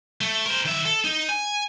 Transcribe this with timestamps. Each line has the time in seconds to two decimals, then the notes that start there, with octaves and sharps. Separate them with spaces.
0.21 A3
0.46 A#4 C5
0.65 D#3 E5
0.85 A4
1.04 D#4
1.29 G#5